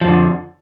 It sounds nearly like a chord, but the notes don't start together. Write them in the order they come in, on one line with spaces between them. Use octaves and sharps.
F3 F2 D3